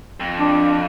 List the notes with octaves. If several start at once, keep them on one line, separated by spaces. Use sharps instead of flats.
F2
D4